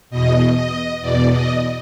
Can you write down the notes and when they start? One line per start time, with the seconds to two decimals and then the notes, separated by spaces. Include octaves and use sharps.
0.10 E2 B2 D#5
0.56 D#5
1.01 E2 B2 D5
1.31 D#5